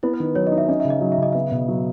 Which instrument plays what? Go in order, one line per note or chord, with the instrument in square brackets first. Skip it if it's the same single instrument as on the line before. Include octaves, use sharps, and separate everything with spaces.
[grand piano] B3 [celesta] E4
[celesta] B4
[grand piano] D#3
[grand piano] F#3 [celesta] C#5
[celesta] D#5
[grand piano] D#4
[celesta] E5
[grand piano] C#4 [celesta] D#5
[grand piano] C#3 [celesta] E5
[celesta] D#5
[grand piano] F#3
[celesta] E5
[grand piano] C#3 [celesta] D#5
[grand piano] B3 [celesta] E5
[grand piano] B2
F#3